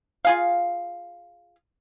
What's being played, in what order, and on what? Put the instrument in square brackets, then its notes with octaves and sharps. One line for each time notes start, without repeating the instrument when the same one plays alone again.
[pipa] F4 G#4 F5